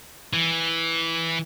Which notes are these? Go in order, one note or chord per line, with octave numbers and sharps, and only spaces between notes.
E3